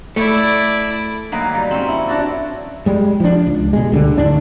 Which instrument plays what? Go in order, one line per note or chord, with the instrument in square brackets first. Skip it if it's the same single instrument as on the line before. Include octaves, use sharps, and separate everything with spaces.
[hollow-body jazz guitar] A3 [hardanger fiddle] E4 D5
[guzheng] D#3 F#3 A#3 B4
G3
C4 C#4
E4
D4 F#4 D5
[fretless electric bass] G3 G#3
F3 D4
C#2
B2 G#3
D2 D3 G3
D1 D#3 D4